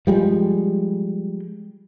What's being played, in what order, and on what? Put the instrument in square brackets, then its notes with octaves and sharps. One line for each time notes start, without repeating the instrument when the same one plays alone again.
[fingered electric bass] F3 G3 G#3